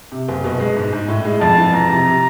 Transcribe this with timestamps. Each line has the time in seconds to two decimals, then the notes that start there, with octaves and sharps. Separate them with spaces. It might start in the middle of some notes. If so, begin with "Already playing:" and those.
0.12 C3
0.28 F#1
0.44 B2
0.60 G#3
0.77 G#2
0.93 G#2
1.08 A2
1.25 G#3
1.41 F2 A5
1.58 E3
1.73 F2 A#5
1.89 C3
2.06 C3